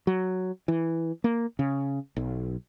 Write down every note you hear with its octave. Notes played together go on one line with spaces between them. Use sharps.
F#3
E3
A#3
C#3
B1